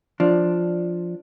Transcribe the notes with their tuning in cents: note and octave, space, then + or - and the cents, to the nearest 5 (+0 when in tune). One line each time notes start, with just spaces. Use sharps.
F3 +0 D4 +0